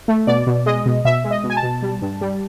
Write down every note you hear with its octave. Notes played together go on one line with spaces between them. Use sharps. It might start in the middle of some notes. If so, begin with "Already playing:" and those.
A3
B2 D5
B2
G#3 D#5
B2
B2 E5
G#3
D#5
B2
G#5
A5
B2
G3
G2
G3